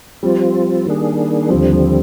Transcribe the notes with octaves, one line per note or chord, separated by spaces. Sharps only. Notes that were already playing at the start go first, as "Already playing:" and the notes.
F3 G3 C4 F4
D#3 A#3 D4 G#4
D#2 D3 F3 G3 C4
F3